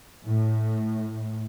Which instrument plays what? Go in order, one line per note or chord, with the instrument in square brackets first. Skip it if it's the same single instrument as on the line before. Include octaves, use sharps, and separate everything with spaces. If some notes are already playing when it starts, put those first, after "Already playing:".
[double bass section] A2